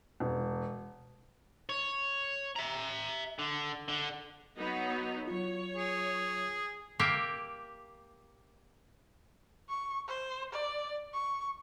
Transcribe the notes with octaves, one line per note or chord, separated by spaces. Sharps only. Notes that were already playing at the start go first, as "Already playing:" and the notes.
E1
C#5
E5 A#5
D3
D3
F#3 B3 D#4
F#3 F4 C#5
G#4
A#3 G4 E5
C#6
C5
D5
C#6